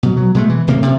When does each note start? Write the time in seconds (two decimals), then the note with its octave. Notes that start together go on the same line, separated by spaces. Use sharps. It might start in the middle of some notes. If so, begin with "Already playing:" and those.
0.03 B2 F#3
0.17 F#3
0.35 B2 G#3 A3
0.50 E3
0.67 D1 C3 A#3
0.83 C3